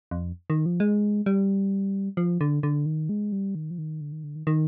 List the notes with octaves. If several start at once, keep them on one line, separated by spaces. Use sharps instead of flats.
F2
D#3
F3
G#3
G3
F3
D3
D3
D#3
G#3
G3
D#3
F3
D#3
D3
D#3
D3
D#3
D#3